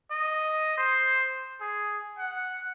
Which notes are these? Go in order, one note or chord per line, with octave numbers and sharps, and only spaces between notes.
D#5
C5
G#4
F#5